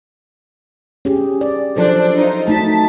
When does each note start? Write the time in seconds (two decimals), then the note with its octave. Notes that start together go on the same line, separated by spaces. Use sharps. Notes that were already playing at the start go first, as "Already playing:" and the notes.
1.05 C#4 G4 G#4
1.41 D5
1.76 F3 F#3 D4 A4 C5
2.17 D#4 F4 C5
2.48 A3 D#4 F#4 A5 B6